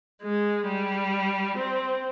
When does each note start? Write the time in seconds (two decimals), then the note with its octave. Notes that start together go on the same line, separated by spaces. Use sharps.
0.22 G#3
0.67 G3
1.57 C4